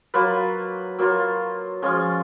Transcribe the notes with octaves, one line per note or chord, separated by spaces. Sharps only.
F#3 A#3 F4 B4
F#3 A#3 F4
F3 G#3 C#4 F4